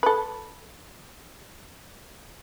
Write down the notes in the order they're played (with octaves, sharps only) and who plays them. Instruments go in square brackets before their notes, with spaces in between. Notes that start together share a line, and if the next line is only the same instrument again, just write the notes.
[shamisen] A4 B4